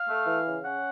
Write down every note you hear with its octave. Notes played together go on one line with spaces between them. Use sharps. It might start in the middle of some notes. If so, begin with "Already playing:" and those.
Already playing: F5
A3
E3
C#3
C#4 F#5